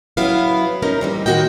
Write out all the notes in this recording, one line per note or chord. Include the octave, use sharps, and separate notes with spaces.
F#3 B3 C#4 E4 F5
C#4 D#4 A#4
E3 G3 C4
A#2 D#3 C4 F#4 D#5 G5